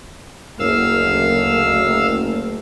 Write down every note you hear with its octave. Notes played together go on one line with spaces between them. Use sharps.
F#1 D2 A3 A#3 F5 E6